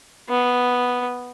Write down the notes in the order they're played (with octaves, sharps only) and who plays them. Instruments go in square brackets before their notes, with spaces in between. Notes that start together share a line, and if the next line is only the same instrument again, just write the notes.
[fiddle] B3